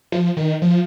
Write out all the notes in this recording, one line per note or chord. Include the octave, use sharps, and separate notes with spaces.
F3
D#3
F3